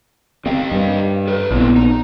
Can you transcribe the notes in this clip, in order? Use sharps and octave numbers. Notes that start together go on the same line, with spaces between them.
C4 G4 D#5 F5
G2
A4 B4
A#1 B3 C4 D4 E4
D#4